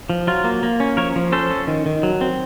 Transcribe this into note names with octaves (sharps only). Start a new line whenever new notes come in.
F3
F#3 F4
A#3
A#3
C#4
F3 A#4 C#5
F3
C#4 A4 C5
C#4
D#3
D#3
F#3
C4